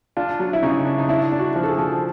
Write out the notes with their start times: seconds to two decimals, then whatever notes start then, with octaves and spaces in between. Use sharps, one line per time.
0.17 D4 F4
0.39 F#3
0.53 E4
0.63 C#3 D#4
0.85 D4
0.98 D#4
1.09 D4 E4
1.32 D4
1.39 F#4
1.55 F3
1.63 A4
1.70 G#4
1.78 F3